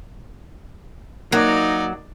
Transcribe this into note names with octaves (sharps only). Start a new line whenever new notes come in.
F#3 A#3 D#4 D5